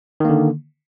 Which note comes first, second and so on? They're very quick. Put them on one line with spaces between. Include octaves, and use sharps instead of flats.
D#3 A#3 D3